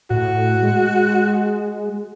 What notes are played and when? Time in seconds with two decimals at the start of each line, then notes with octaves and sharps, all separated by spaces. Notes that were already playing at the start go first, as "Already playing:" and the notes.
0.11 A2 F#4
0.62 G#3